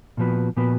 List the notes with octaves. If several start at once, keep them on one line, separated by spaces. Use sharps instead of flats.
A#2 F3 B3 F#4 B4
A#2 F3 B3 F#4 B4